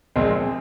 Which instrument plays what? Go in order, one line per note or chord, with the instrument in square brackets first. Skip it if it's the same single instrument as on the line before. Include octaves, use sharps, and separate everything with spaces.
[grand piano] A#1 A#2 G#3 C4